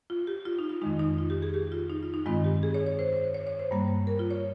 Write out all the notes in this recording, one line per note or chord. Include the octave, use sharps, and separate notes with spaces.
F4
G4
F4
D#4
F4
F2 D#3 G#3 D#4
D#4
F4
G4
G#4
G4
F4
D#4
F4
D#4
G2 D#3 G#3 C4 F4
G4
G#4
C#5
C#5
C5
C5
C#5
C#5
C#5
C5
G2 G3 A#3
A#4
F4
C#5